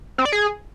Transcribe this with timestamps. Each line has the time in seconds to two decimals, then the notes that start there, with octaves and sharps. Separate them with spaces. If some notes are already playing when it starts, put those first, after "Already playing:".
0.18 C4
0.25 D5
0.32 G#4